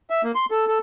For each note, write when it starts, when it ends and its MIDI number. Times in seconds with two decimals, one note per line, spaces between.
0.10 0.22 76
0.24 0.32 58
0.35 0.45 84
0.51 0.65 69
0.68 0.78 69